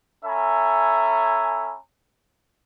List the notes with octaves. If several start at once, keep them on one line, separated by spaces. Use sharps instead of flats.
C#4 A4 E5 G#5 A#5 B5